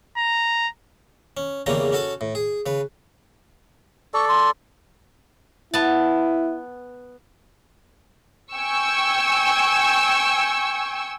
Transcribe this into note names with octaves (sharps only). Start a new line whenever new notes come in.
A#5
C#4
E2 C#3 G3 A#3 C#4 A#5
C#4 F#4 A4 A5
A2
G#4
C#3 B4
A4 D5 C#6
C6
B3 E4 A5
G5 G#5 C#6 E6